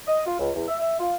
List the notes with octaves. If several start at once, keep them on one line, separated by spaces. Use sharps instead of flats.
D#5
F4
C#2
E2
E5
E5
F4